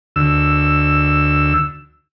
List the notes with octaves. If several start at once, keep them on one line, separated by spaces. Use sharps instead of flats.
D2 E6